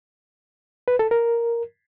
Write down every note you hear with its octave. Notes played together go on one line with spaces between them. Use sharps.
B4
A4
A#4